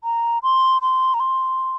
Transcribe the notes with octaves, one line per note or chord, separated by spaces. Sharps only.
A#5
C6
C6
A#5
C6